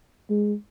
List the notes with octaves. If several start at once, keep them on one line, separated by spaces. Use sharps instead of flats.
G#3